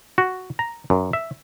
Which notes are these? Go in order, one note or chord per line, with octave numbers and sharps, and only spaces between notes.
F#4
A#5
F#2
E5